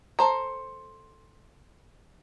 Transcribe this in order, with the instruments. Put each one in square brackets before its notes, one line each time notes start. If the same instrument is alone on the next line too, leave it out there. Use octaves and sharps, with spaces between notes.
[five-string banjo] A4 C5 A#5